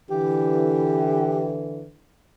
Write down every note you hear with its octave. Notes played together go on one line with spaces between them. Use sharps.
D3 E3 G4